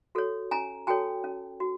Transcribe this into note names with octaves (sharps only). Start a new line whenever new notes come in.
F#4 A4 C#5
C#4 G#5 A#5
F#4 A4 C#5 G5 A5
C#4
F#4